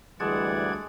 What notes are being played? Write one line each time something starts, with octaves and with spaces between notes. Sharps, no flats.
D2 E3 G3 G#3 D5 F#5 A5 G#6